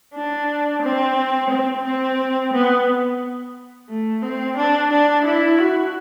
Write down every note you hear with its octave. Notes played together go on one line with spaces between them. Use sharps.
D4
C4
C4
C4
B3
A3
C4
D4
D4
E4
F#4